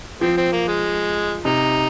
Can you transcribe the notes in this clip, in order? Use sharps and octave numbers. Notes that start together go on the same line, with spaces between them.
F3 C4
C4
A#3
G#3
C3 D#4